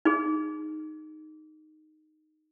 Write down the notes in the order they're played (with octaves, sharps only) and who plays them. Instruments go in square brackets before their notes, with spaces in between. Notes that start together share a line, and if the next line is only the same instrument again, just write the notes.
[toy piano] D#4 G#4